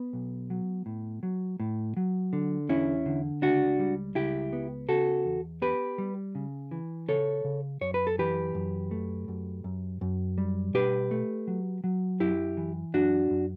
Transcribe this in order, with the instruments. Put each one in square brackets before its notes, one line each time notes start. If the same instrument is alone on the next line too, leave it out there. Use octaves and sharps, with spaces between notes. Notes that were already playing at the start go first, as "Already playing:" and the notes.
Already playing: [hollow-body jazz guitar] B3
B1
F#3
A2
F#3
A2
F#3
D3
E2 C#4 E4
D3
C#2 D4 F#4
G3
C#2 E4 G4
B3
C#3 F#4 A4
E2
B3 G4 B4
G3
C#3
E3
C#3 A4 C#5
C#3
F#2 C#5
B4
A4
E3 G4 B4
F#2
A3
F#2
F#2
F#2
G3
B2 G4 B4
A3
F#3
F#3
F#2 E4 G4
E3
F#2 D4 F#4
F#2